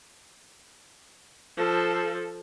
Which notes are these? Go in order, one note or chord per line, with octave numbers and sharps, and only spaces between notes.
F3 A4